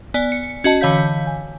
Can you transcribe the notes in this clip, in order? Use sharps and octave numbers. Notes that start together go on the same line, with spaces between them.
B3 D5 G#5
C#7
C#4 F#4 D#5 A5
D3 E3 C#5 F5 G6 B6
G#5